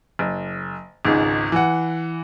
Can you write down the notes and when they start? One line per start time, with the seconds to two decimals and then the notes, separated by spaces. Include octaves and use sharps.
0.19 F#1
1.05 G#1 C#2 G#2
1.52 E3 F#5